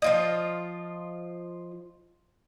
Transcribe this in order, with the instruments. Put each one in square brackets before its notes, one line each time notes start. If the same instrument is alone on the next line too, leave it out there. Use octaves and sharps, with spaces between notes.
[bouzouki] F3 F4 D#5